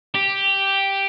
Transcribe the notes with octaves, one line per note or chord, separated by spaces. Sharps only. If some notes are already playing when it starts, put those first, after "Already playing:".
G4